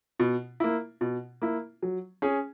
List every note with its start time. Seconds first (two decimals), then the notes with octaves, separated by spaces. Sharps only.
0.19 B2
0.60 A#3 E4
1.01 B2
1.42 A#3 E4
1.82 F#3
2.22 C#4 G#4